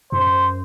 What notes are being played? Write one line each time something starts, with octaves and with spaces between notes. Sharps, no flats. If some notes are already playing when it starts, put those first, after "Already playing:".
F#2 C5